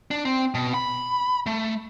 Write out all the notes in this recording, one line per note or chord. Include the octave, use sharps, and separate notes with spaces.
D4
C4
B2
B5
A3